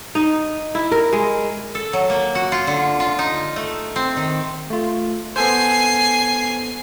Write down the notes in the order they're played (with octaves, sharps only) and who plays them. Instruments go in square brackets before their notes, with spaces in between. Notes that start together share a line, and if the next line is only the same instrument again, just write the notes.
[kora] D#4
E4
A#4
G#3
[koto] A4
F#3
A#3
F#4
F4
D3
F4
D#4
A3
C4
D#3
[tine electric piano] A3 F4
[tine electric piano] B3 A4 C5 [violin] G#5 C7